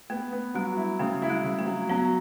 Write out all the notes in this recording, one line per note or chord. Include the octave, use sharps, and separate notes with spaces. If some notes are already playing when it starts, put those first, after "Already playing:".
A3 B3
B3
F#3 G3
E4
C#3 A3
E4
G3
C#3
A3
F#3
F#3 B3